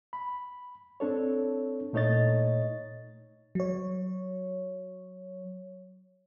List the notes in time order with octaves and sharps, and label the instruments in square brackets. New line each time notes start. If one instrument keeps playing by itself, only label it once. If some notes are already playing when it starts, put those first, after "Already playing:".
[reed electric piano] B5
C4 D4 A4 C#5
A#2 A3 D#4 C#5 D#5 A6
[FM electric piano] F#3 C#5